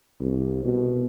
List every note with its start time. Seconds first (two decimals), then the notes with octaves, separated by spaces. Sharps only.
0.20 C2
0.65 B2